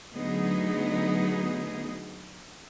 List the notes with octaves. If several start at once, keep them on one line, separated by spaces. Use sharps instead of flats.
D3 F#3 A3 B3 D#4 G#4